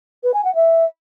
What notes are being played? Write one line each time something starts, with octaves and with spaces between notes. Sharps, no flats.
B4
G#5
F#5
E5